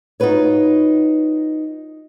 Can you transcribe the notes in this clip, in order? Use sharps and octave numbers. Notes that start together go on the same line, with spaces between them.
D#4 F4 F#4 B4 C#5